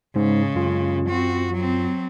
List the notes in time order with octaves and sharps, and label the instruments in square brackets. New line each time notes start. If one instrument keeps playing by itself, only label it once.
[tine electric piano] G#2 [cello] C#3 G#3
[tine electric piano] F#2 F4
[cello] C4 F#4
F#3 C4